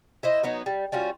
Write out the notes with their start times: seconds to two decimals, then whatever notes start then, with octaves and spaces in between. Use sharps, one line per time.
0.23 E4 C5 D#5
0.43 F#3 B3 D#4
0.66 G3
0.92 G3 C#4 F4 F#4